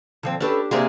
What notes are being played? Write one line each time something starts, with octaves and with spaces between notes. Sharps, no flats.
D3 F3 C4
C#4 D4 G4 A4 B4
C3 G#3 A#3 D4 G4 G#4